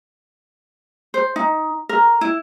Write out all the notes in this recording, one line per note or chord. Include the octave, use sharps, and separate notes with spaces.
C5
D#4
A#4
E4